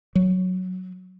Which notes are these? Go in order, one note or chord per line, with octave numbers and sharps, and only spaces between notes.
F#3